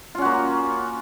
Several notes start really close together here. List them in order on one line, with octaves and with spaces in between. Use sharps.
F4 C#4 F#4 A#3